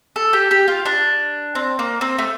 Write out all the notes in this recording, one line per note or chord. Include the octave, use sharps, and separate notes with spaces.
A4
G4
G4
F4
D4
C4
A#3
C4
A3